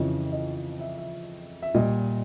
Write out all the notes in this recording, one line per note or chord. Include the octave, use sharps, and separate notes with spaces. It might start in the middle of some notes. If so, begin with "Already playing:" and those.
Already playing: F2 C#3 E3 D#5
D#5
E5
E5
E5
A#2 G3 D#5